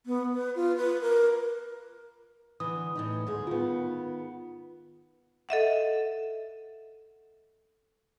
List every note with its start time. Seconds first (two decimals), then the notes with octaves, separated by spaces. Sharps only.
0.06 B3
0.34 B4
0.56 F4
0.77 B4
1.02 A#4
2.60 D3 E3 D#6
2.95 A2 E3 D#4
3.27 D2 G#2 G#4
3.47 D#3 B3 F4
5.49 A4 D#5 E5 F#5